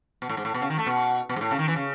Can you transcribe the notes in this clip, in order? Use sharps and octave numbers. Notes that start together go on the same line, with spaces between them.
B2
A2
G#2
A2
B2
C#3
D#3
A3
B2
B2
G#2
A2
C#3
D#3
E3
C#3